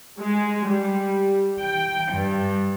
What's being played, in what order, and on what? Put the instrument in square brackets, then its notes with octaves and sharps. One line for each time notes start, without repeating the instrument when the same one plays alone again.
[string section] G#3
G3
G5
G2